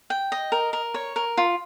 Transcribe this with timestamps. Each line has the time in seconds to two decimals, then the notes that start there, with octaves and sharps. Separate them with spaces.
0.10 G5
0.32 D#5
0.52 A#4
0.73 A#4
0.94 C#5
1.16 A#4
1.37 F4